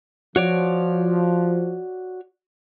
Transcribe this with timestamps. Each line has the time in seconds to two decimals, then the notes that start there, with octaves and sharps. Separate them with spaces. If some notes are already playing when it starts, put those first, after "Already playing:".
0.36 F3 F#4 C#5 D5